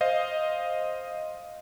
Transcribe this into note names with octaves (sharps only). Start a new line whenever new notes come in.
C5 D#5 F5